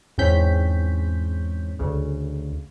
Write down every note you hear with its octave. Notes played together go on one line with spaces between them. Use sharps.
E2 G#2 C4 C#4 G6 B6
D2 C#3